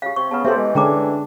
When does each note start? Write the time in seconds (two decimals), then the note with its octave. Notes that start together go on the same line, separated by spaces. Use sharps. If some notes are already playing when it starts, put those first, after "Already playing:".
0.02 C#3 G4 F5
0.16 C3 C#6
0.31 C#3 B3 B4 A5
0.45 B3 G4 A4 C5 E5 C6
0.57 E3 G#3
0.75 D3 G#3 C#4 D4 G5 A#5 D6